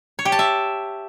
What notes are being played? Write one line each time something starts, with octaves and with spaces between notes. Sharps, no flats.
C#5
G4
A5
E5